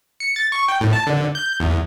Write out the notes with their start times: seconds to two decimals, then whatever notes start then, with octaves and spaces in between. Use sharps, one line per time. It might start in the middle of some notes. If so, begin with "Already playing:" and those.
0.20 C#7
0.36 A6
0.52 C#6
0.68 G5
0.81 A2
0.93 A5
1.07 D3
1.35 G6
1.60 E2